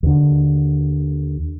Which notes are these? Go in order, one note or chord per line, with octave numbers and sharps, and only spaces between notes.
D#2 D3